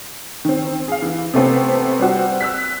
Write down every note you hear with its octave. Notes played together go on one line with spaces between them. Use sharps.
D#3 C4
G#4 F5
E3
C3 A3 B3 C4
G3 C4 F#4
E6 F#6 B6